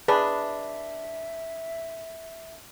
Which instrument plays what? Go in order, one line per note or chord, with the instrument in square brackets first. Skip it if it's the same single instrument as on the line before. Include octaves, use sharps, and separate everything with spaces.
[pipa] D4 [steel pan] G#4 B4 [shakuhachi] E5